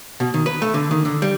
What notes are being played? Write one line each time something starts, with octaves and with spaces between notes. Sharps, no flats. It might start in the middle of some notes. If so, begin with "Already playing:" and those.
B2
D#3
B4
A3
D3
D#3
D3
G3